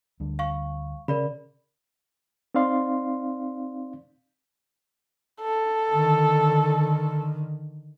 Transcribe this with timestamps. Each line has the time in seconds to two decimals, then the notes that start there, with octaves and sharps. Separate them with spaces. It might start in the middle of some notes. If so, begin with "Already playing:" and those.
0.20 D2 G3 D4
0.39 F5 C#6
1.08 C#3 A#4 D5 B5
2.55 C4 D#4 D5 F5 C6
5.41 A4
5.91 D3 D#3